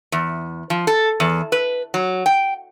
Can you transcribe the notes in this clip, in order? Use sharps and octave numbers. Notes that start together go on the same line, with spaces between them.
E2
F3
A4
E2
B4
F#3
G5